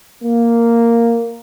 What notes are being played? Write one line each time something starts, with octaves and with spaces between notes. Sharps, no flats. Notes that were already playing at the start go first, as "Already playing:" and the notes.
A#3